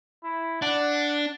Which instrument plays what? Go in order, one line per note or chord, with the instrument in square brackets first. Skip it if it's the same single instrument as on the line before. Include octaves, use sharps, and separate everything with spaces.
[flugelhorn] E4
[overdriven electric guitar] D4 [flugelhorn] F#5